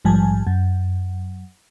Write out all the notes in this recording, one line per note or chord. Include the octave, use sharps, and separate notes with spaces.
A#1 G#2 F3 G3 G#5 A5
F#2